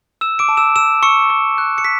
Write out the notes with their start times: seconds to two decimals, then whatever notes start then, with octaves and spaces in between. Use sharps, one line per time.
0.21 E6 E7
0.39 D6 D7
0.49 A5
0.57 E6 E7
0.76 E6 E7
1.03 C#6 E6 C#7
1.30 C#6
1.58 F#6
1.78 C#7
1.84 B6